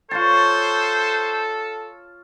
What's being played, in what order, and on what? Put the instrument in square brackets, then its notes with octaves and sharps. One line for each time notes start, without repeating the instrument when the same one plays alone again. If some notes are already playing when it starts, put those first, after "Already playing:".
[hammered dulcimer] F4 C#5 A5 [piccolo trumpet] A4 [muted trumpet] C5